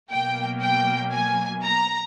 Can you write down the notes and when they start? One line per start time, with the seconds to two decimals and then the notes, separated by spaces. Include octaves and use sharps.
0.10 B2 F#3 A#3 G5
0.62 G5
1.12 G#5
1.64 A#5